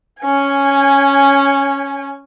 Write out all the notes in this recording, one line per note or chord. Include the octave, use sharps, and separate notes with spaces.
C#4 G#5